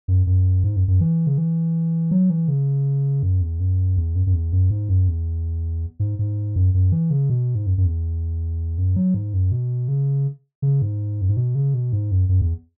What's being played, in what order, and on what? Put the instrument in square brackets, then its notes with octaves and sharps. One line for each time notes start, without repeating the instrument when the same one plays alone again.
[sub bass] F#2
F#2
G#2
F#2
F#2
E3
C#3
E3
F#3
E3
C#3
F#2
E2
F#2
E2
F#2
F#2
E2
F#2
G#2
F#2
E2
G#2
G#2
F#2
F#2
E3
C#3
B2
G#2
F#2
F#2
E2
F#2
F#3
G#2
F#2
B2
C#3
C#3
G#2
F#2
G#2
B2
C#3
B2
G#2
F#2
F#2
E2